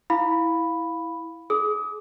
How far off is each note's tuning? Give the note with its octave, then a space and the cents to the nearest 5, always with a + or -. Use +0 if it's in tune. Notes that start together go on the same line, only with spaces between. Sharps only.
E4 -5 F5 +5 B5 +0
G#4 +30 D#6 +30